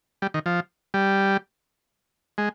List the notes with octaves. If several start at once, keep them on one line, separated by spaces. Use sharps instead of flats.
G3
D#3
F3
G3
G#3